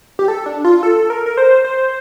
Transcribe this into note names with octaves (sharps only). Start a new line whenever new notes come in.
G4
A4
D4
F4
A4
A#4
A#4
C5
C5